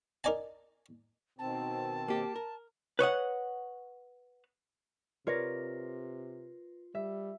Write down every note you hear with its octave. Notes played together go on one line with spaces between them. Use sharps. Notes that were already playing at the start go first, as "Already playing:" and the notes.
D#4 A#4 D5 G#5 A5
B2 D#3 C4 A5
A#3 G4
A#4
B4 C#5 D#5 F#5
C3 F4 A#4 B4 C#5 D5 A#6
G3 E5